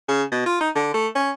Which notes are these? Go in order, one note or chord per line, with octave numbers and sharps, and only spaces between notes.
C#3
B2
F4
D#4
D3
A3
C#4